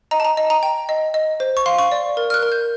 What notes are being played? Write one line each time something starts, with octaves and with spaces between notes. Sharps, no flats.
D#5 A#5
A5
A#5
D#5
A#5
G5
D#5
D#5
C5
C#6
F5 C6
C#6
D5
A#4
F6
F#6
A#4
G6